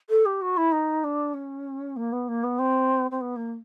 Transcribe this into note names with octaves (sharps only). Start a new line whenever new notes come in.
A4
G4
F#4
E4
D#4
D4
C#4
A#3
B3
A#3
B3
C4
C4
B3
A#3